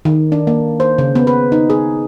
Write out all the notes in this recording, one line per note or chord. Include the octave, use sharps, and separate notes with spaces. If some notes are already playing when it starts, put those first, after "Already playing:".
D#3
D4
A#3
C5
C#3
B3
B4
D#4
G#4